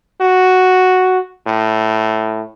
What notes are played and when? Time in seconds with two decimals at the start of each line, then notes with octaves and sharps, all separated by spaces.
0.21 F#4
1.47 A2